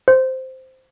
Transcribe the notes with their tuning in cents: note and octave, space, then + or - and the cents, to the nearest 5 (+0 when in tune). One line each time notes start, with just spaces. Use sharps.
C5 -5